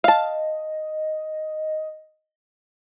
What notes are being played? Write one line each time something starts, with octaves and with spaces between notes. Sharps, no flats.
D#5 F5 A5